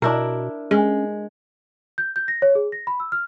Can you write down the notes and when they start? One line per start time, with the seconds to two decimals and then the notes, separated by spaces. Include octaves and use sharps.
0.02 B2 D4 E4 A#4
0.71 G#3 C#4
1.98 G6
2.16 G6
2.28 A#6
2.42 C#5
2.55 G#4
2.72 A#6
2.87 B5
3.00 E6
3.12 F6